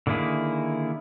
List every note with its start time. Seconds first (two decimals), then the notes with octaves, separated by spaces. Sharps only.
0.07 D3 D#3 A#3 E4 G#4